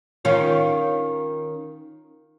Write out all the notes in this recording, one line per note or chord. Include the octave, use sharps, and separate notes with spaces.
D#3 C#4 F4